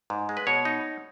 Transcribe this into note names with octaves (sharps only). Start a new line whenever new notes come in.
G#2
G#3
B4
B2 C#5
D#4